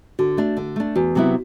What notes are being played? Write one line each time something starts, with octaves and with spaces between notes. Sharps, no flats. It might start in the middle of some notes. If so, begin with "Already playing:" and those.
D3 F#4
A3 D4
D3
A3 D4
E2 F#4
C3 F#3 B3 E4